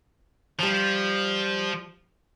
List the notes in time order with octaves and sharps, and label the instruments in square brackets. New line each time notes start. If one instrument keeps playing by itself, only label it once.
[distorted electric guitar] F3 [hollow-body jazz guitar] G3 A5